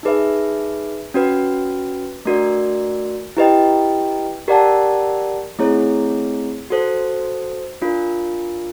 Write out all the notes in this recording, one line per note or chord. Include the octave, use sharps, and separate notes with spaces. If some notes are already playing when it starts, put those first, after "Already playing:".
D#4 G#4 B4 E5
C#4 F#4 B4
A3 D4 F#4 A#4 D5
E4 G4 B4 D#5 G5
G4 A#4 D5 F#5 A5
A3 C4 E4 G#4 C#5
F#4 A4 C5
D4 F4 A#4